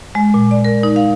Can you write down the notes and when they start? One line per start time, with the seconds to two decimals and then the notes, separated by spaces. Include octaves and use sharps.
0.15 G#3
0.34 A#2
0.51 D5
0.65 A#4
0.83 D#4
0.96 F5